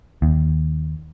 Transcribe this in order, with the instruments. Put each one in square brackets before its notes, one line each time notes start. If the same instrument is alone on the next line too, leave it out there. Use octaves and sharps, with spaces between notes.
[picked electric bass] D#2